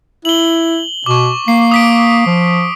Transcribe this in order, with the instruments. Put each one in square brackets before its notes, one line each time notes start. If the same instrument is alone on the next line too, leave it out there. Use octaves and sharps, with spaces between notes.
[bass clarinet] E4 [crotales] F#7 G7
[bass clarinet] B2 [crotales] C#6 D6
[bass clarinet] A#3 [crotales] C7
[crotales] D#6 B6 D7
[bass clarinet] F3